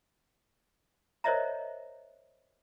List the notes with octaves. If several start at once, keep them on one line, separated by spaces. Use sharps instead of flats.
A#4 C5 C#5 D#5 E5 A#5